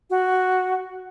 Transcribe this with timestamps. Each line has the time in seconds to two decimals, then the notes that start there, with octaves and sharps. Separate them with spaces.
0.10 F#4